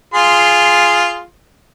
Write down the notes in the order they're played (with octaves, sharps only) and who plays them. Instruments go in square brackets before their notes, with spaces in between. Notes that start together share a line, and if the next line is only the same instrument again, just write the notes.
[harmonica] F4 G#4 C6